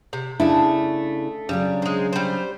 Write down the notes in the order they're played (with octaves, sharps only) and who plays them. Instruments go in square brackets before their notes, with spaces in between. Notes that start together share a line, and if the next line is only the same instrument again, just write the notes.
[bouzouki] C3
[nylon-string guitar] C#3 D4 E4 [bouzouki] A3
[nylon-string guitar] C#3 F#3 D4 [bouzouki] G3
[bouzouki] G#3 C4
G3 C5